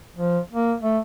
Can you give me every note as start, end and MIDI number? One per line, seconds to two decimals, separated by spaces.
0.17 0.39 53
0.52 0.74 58
0.83 0.99 57